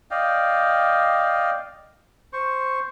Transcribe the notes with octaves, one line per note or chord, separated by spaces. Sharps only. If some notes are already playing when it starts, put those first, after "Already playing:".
D5 D#5 F5 G5
C5 C#6